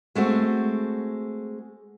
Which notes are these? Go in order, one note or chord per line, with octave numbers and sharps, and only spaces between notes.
G#3 A3 C4 F#4